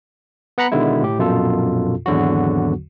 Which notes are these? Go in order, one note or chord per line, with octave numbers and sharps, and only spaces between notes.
B3 F#5 A#5 B5 C#7
B2 D3 D#3 G#3 E4
A2 G4
A#1 F#2 B2 F4 A4
G#1 E2 D3 F#3 F#4